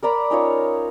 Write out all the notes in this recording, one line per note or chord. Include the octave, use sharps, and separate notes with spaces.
A#4 D5 A#5 B5
C#4 D#4 F4 C#5